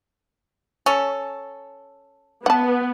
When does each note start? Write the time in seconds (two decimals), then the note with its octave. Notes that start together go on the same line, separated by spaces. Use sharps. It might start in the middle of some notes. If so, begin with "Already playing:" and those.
0.86 C#4 A4
2.46 B3 F#5 A5